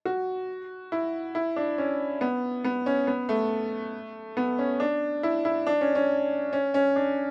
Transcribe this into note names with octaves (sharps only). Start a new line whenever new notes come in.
F#4
E4
E4
D4
C#4
B3
B3
C#4
B3
A3
B3
C#4
D4
E4
E4
D4
C#4
C#4
C#4
C#4
D4